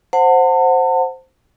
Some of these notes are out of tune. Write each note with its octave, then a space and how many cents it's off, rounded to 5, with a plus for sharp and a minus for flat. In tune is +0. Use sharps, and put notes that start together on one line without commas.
C5 +0 F#5 -10 A5 +35